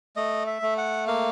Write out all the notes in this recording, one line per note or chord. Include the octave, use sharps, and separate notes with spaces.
A3 D#5
E5
A3
F#5
A#3 F5